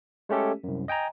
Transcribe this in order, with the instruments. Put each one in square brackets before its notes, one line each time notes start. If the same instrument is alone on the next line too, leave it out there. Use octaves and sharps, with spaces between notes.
[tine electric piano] G#3 A3 C#4 G4 A4
C2 F#2
D#5 G5 G#5 A#5